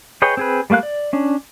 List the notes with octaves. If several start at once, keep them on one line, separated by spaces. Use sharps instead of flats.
G#4 B4 C#5 D#5 G5
C4 G#4 B4
G3 A3 A#3 F5 F#6
D5
C#4 D4